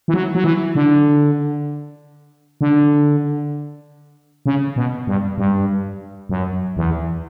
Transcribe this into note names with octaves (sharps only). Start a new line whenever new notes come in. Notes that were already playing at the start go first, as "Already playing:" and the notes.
E3
F#3
F#3
E3
D3
D3
C#3
B2
G2
G2
F#2
E2